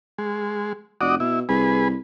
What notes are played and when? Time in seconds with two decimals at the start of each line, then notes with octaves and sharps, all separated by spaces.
0.18 G#3
1.01 F1 F#4 D5 D#5
1.20 B2 E4
1.49 C2 G#4 B4